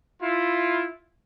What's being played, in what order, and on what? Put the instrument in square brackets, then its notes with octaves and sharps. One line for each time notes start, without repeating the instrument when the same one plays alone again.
[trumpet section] E4 F4